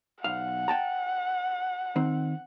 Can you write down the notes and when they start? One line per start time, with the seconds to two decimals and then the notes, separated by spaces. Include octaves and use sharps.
0.24 B1 F5 F#5
0.68 G5 A5 A#5
1.96 D#3 C4